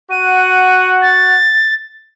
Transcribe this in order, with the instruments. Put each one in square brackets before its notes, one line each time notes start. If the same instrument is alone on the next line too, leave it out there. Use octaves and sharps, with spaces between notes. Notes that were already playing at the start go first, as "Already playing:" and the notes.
[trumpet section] F#4 F#5 [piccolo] D#7
[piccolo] A6